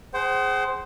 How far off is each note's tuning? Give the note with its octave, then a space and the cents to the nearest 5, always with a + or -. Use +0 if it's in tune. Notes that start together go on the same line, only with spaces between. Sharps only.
G#4 +0 C5 +0 F#5 +45